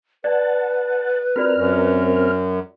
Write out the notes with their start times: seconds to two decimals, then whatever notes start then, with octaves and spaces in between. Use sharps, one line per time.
0.24 B4 D5 F#5 A5
1.36 C4 F4 F#4 A#4 D5 F6
1.56 F#2